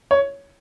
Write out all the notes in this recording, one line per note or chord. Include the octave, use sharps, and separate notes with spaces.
C#5